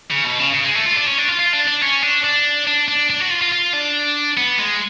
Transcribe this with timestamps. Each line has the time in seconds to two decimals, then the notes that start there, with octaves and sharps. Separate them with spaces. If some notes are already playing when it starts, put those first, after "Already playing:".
0.11 C#3
0.25 B2
0.39 C#3
0.54 C#3
0.64 G#3
0.75 A3
0.86 F4
0.96 D4
1.07 C#4
1.18 D4
1.28 F4
1.39 F4
1.53 D4
1.67 D4
1.82 C#4
2.03 D4
2.24 D4
2.67 D4
2.88 D4
3.10 D4
3.20 F#4
3.31 F4
3.42 F4
3.52 F4
3.73 D4
4.37 B3
4.59 G#3